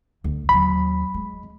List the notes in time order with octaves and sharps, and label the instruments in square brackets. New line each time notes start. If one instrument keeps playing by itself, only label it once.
[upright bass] D2
[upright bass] D#2 F#3 [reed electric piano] B5
[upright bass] G#3